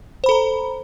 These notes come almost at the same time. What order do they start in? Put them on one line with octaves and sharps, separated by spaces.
C5 B5 A4 A#5